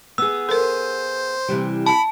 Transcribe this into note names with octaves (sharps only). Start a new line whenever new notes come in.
B3 G#4 E6
A4 A#4 C5
C3 E3 G3
A5 B5